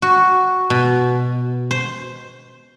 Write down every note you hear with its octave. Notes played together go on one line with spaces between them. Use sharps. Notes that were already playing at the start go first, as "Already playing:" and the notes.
F#4
B2
C5